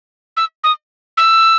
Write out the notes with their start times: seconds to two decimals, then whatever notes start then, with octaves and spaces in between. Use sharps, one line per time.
0.37 E6
0.64 D#6
1.17 E6